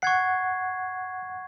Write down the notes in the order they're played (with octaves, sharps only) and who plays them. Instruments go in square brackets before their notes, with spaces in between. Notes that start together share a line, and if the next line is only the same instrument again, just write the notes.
[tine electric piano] F#5 [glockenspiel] C#6 G#6 C7